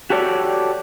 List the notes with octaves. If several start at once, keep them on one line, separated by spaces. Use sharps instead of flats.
F#4 G4 A4 C#5 D5